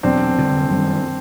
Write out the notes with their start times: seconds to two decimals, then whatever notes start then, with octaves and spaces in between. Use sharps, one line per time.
0.03 E2 B2 F#3 C4 D4
0.36 F1 D#2 D3 G3
0.70 F#2 D#3 G3